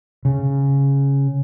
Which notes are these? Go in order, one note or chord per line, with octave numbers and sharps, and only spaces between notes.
C#3